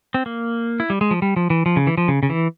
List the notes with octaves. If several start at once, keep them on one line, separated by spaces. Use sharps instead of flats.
C4
A#3
E4
G3
G#3
F3
G3
F3
E3
F3
C#3
E3
F3
C#3
C#3
E3